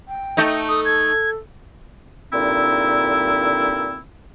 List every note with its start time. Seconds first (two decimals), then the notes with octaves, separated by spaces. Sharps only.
0.08 G5
0.37 A3 D#4
0.69 A4 D#6
0.85 G#6
2.33 G2 A#2 D3 C4 D#4 E4